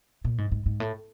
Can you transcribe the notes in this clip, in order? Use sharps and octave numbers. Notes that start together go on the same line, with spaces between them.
A#2
G#2
G#2
G#2
A2